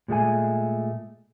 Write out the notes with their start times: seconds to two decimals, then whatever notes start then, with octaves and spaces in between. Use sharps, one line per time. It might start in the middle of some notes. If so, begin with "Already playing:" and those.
0.08 A#2 G#3 A3 G#5